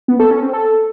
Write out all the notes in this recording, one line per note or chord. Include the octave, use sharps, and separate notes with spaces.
B3
A4
C#4
C4
A4